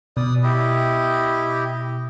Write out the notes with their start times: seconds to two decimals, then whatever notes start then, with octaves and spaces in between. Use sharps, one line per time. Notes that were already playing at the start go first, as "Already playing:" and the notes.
0.17 B2 D5 D#6
0.43 E4 G4 D#5